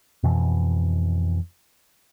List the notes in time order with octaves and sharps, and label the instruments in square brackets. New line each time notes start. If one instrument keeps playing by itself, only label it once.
[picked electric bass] F2 B2 E3